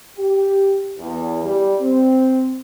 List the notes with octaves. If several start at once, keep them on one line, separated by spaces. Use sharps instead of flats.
G4
E2
G3
C4